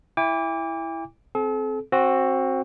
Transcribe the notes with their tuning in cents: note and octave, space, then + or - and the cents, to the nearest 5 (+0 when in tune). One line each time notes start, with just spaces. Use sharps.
E4 +5 G5 +45 D6 -20
C4 +0 A4 -40
C4 +20 F#4 +0